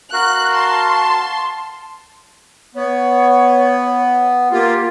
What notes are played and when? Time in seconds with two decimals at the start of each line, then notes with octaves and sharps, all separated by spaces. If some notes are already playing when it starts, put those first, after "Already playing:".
0.13 F#4 A#4 F5 F#6
0.55 A5 C6
2.75 B3 C#5
4.51 A#3 F4 G4